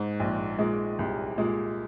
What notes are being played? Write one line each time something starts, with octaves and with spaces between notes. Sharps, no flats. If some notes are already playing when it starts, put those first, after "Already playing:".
Already playing: G#2
A#1
A#2 G#3
C2
A#2 G#3